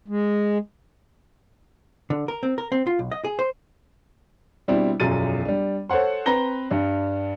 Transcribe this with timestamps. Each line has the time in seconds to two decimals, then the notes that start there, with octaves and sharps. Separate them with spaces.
0.08 G#3
2.10 D3
2.28 A#4
2.43 C4
2.58 A#4
2.72 C4
2.87 F4
2.99 B1
3.12 D#5
3.24 G#4
3.39 C5
4.68 B2 G3 C4 D4 E4
5.00 E1 B1 F#2 F3 A6 D#7
5.45 G3 D4
5.90 A4 C5 C#5 F#5 C6
6.26 C4 B4 A#5 A#6 G7
6.71 G2 G3 D4